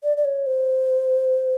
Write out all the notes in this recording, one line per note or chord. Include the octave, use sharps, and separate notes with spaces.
D5
D5
C#5
C5